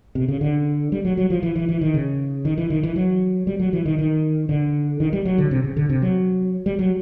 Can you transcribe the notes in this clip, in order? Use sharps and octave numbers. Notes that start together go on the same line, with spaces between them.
C3
C#3
D3
G3
F#3
F#3
F3
E3
E3
E3
D#3
C#3
D#3
E3
D#3
E3
F#3
G3
F#3
E3
D#3
D#3
D3
D#3
G3
F#3
D3
C3
C#3
D3
C3
F#3
G3
F#3